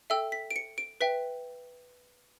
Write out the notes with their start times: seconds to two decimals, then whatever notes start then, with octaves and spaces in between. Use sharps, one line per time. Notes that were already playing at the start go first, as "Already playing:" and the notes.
0.10 A4 E5 G5 E6
0.32 B6
0.50 D7
0.56 C#7
0.78 D7
1.01 B4 E5 G5 B6